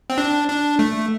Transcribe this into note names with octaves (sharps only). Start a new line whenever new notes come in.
C4
D4
D4
A3